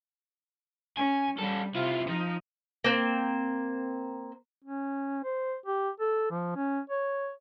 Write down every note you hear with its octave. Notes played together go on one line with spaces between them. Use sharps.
C#4 G#5
G3 C#4 A4
C3 E4 F4
F3 D#4
A#3 C4
C#4
C5
G4
A4
F3
C#4
C#5